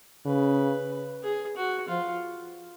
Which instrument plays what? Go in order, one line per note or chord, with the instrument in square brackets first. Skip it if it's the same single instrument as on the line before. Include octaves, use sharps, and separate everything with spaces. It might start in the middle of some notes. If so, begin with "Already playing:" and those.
[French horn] C#3 [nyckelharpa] B4
[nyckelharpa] G#4
F#4
[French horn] F3 [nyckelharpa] F4